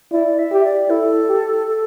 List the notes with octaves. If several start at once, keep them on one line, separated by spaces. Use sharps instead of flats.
E4 D5
E5
G4
D5
E4 A4
G4
A4